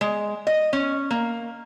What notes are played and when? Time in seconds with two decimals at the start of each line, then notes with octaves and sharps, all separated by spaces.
0.01 G#3
0.47 D#5
0.73 C#4
1.10 A#3